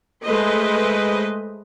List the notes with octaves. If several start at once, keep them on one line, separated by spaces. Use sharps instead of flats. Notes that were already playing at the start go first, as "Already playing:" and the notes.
G#3 A3 B4 C5 D#5